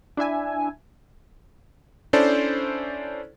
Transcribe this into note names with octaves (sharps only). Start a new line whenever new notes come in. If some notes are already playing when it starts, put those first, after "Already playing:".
D4 E4 E5 G#5
C#4 D4 E4 A4 C5 D5